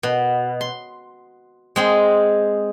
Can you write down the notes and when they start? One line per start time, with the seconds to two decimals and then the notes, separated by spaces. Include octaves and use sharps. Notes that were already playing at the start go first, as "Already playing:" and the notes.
0.03 B2
0.61 C6
1.76 G#3 C4 G#4